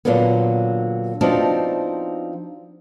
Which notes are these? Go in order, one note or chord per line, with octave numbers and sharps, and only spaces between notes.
A#2 D3 F#3 A#3 B3
F3 B3 C4 D4 D#4 F#4